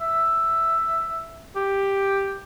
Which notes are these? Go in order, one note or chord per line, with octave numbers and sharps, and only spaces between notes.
E5
G4